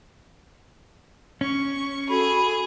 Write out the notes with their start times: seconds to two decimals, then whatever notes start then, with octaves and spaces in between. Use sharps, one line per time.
1.41 C#4 C#6
2.09 F#4 G#4 A4 B5